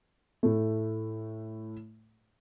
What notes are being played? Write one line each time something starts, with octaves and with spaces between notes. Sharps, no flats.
A2 A3